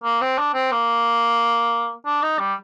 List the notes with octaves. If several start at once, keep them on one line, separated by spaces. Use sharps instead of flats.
A#3
C4
D4
C4
A#3
D4
D#4
G3